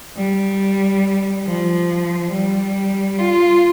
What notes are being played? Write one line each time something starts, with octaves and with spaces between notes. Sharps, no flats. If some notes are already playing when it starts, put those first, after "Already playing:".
G3
F3
G3
F4